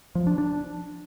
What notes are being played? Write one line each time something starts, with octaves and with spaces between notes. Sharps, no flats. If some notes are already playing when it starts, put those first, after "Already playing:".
F3
D4
D4